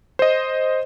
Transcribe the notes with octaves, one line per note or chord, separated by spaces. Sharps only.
C5 D#5